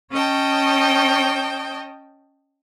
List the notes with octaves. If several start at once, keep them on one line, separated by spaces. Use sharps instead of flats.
C#4 C#5 D#5 G5 A5